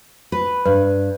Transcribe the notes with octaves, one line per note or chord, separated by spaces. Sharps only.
B4
G2 B4